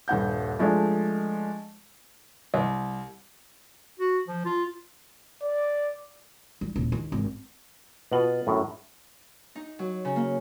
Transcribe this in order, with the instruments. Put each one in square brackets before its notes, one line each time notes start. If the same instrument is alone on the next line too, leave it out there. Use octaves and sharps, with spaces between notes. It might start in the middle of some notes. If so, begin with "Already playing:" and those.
[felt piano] D#1 G2 F#5 G6
F3 G#3 A3 D4
[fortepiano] C2
[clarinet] F#4
F3
F4
[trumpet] D5
[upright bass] G3
D#1
D#2
G#1
[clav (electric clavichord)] B2 [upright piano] B3 F4 F#7
[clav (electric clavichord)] F#2 A2
[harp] D#4
F#3
C#3
A#3